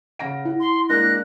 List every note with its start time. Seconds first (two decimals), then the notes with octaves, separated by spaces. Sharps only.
0.19 C#3 F#5 A#6 D7
0.45 E4 F#5
0.60 C6
0.89 G#3 A#3 D4 F#6 A#6